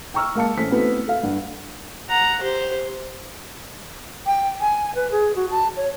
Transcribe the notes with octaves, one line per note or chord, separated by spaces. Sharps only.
G5 A#5 C#6 E6 F6
G#3 A#3 F5 A5 C#7
A1 A3 C#4 C5 B6
A3 B3 C4 E4 F#4 B4
A4 F5
G2 F#5
F#5 A#5
G4 C5
G5
G#5
B4
G#4
F#4
A5
C#5